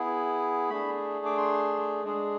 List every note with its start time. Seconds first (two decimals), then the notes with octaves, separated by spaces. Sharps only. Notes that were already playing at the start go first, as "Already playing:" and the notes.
Already playing: B3 E4 G#4
0.70 A3 D4 G#4 B5
1.26 D6
1.37 C6
2.04 G#3 D4 G#4